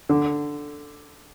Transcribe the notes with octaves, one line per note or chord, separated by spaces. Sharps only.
D3